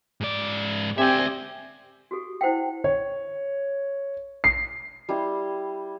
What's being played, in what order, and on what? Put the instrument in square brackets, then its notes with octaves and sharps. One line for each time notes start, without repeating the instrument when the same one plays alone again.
[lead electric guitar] G#2 D5
[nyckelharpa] C4 G#5 [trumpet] G4 [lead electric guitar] D5 E5
[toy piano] F#4 G4 A4
E4 C5 F#5 G5
[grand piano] C#5
C7
[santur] G3 E4 C6